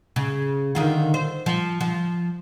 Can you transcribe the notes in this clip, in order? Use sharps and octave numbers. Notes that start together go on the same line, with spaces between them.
C#3
D3 D#3 F4
C5
F3
F3